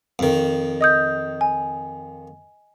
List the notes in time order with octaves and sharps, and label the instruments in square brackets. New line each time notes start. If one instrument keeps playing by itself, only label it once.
[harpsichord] F2 D#3
[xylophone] D#5 D#6 G6
G#5